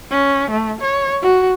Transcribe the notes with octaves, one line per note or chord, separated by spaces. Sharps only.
C#4
A3
C#5
F#4